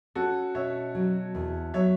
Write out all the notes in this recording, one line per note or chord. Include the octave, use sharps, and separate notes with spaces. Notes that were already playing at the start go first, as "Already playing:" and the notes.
C#4 F#4 A4
B2 C#5 E5
F#3
E2
F#3 C#5 E5